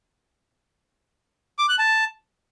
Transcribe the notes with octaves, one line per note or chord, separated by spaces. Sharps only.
D6
F#6
A5